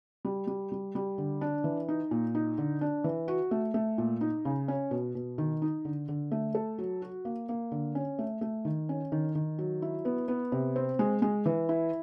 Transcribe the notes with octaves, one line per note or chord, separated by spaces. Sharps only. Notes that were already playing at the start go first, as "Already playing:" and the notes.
G3
G3
G3
G3
D3
D4
E3
D#4
A#2
D#4
D3
D4
E3
F#4
A3
A3
A#2
D#4
C#3
C#4
B2
B2
D#3
D#4
D3
D3
A3
A4
F#3
F#4
A#3
A#3
D3
C#4
A3
A3
D#3
C#4
D#3
D#3
F#3
E4
B3
B3
C3
C4
G#3
G#3
E3
E4